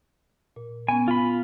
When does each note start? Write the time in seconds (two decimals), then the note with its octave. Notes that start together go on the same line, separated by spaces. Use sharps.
0.56 A#2
0.88 B3 C#4 G#5
1.08 F4 B5